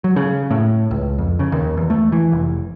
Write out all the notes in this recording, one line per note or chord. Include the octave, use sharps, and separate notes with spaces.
F#3
C#3
A2
C#2
F2
C#3
D#2
E2
A3
E3
F1